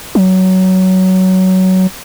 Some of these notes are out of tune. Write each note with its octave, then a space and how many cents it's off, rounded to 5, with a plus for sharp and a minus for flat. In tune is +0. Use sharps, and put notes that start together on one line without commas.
F#3 +15